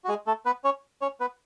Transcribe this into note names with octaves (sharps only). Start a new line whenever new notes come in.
F#4
G#3 G#4
A3 A4
B3 B4
C#4 C#5
C#4 C#5
B3 B4